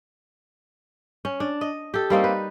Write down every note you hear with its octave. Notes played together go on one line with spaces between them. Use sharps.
C#4
D4
D#5
G4 A4
G3 A#3 C4 D#4
B4